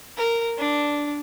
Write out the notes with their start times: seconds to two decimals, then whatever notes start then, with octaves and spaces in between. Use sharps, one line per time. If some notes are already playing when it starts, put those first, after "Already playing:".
0.17 A#4
0.58 D4